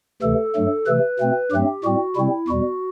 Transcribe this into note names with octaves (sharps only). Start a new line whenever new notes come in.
D2 C3 E3 A3 A4
G2 F#3 A3
C3 E3 A3 B4
B2 A3 C4
G2 F#3 A3 C4 G4
A2 G3 C4 F#4
C3 G3 C4 E4
E2 B2 G3 F#4